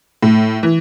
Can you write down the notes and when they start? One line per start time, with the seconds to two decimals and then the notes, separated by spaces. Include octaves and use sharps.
0.23 A2
0.63 E3